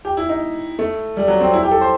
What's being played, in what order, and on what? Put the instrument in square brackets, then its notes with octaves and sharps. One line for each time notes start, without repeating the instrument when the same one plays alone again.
[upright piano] G4
E4
D#4
A3
G3
F#3
C4
E4
G4
A4
C5